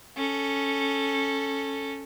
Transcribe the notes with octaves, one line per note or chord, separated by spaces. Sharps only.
C#4 A4